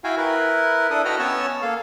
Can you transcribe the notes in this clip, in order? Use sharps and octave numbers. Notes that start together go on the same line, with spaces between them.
E4 F#4 F5 G5 G#5
E4 A#4 B4
D4 E4 A4 D#6
F#4 B4 D#5 F#5 G5 F6
B3 C#4 C#5 G#5 A5 E6
A#3 A4 F5